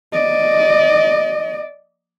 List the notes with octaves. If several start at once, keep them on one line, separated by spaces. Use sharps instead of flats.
D5 D#5